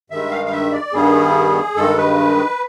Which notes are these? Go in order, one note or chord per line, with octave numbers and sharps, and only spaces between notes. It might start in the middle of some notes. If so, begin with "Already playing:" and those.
G2 D#3 G#3 E5
F5
F5
E5
D5
G2 D#3 G3 B3 G#4
G2 D#3 G#3 A4
B4